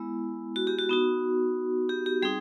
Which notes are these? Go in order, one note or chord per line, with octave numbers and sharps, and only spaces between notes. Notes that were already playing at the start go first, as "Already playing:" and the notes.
Already playing: G#3 B3 E4
F#4
G4
F#4
B3 D#4 F#4
G4
G4
G3 C4 D#4 G#4